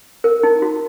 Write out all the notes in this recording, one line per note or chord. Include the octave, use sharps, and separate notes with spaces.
A#4
D#4
F#4